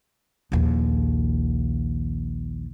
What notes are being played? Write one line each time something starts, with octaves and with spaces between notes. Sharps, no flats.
A#1 D#2